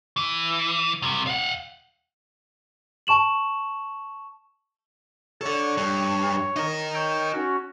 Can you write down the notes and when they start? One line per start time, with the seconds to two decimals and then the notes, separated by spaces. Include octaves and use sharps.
0.16 E3
1.02 C3 G3
1.27 F5 F#5
3.07 A5 C#6 E7 F#7
5.41 A4 C#5 D5
5.77 G2
6.56 D#4 A#4
6.94 C#5 G5 E6
7.32 C#4 F#4